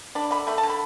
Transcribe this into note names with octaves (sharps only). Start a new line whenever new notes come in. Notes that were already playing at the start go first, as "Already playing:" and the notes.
D4 B5
D3 B5
A3 B5
A5
D3
B5